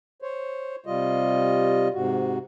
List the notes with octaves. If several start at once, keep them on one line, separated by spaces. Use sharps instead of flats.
C5 C#5
C3 G3 F4 D#5
G#2 C3 F#4